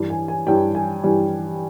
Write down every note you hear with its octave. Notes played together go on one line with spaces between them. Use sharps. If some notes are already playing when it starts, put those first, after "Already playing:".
Already playing: G2 E3 G3
G#5
G#5
G2 E3 G3 G5
G#5
G2 E3 G3 G#5